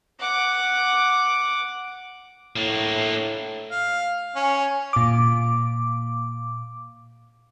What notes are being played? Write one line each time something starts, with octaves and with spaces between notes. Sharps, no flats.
F#5 D6
A2 A#3 D4
F5
C#4
A#2 D6